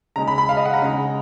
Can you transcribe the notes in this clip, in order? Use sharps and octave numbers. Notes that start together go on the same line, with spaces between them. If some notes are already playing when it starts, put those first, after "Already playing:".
C#3 G#3 D#4 A#5
B5
B5
F5
D#5
F#5
A#5
C#3 G#3 D#4